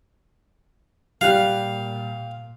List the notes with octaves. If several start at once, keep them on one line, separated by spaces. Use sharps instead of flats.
A#2 G3 G4 F5 F#6